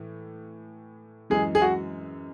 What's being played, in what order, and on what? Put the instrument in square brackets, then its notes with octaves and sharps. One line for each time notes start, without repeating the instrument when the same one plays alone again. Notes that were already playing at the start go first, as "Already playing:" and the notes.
Already playing: [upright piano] A2 E3
[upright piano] F#2 E3 G#3 [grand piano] G#4
[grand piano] G#4
F#4